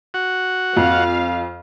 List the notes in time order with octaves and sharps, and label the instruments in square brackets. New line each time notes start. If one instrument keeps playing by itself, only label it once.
[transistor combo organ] F#4
[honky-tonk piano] F2 [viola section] F5